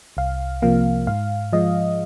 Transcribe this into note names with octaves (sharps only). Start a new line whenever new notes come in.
C2 F5
C3 F3 A#3 F5
G#2 F5
F3 G#3 D#5